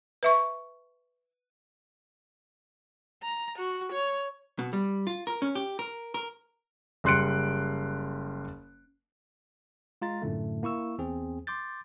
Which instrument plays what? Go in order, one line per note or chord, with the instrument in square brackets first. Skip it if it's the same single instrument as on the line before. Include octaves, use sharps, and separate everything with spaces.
[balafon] B4 E5 C#6
[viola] A#5
F#4
C#5
[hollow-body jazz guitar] B2
G3
F4
A#4
C#4
G4
A#4
A#4
[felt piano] F#1 G3 C6 F#6 C#7 D7
[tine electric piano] G#3 F4 A#5 A6
F#2 A2 D3 A3
A#3 E4 C#6 E6
E2 C4 G#4
C6 D6 G6 A6